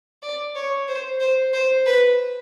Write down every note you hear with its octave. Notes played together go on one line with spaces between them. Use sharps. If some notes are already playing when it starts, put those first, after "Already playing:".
D5
C#5
C5
C5
C5
B4